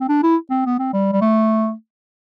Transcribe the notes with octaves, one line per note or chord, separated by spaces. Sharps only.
C4
D4
E4
C4
B3
C4
G3
G3
A3